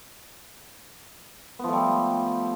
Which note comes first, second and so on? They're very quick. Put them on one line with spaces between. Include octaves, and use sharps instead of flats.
B3 F3 A3 G3